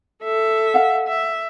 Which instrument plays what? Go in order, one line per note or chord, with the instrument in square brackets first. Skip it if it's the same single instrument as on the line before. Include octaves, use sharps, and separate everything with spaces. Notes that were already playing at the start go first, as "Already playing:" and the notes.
[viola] A4 E5
[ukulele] F5 F#5
[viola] E5